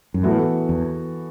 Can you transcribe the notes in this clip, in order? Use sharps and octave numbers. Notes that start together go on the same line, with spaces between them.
F#2
A2 E3 B3 F#4 A4
E2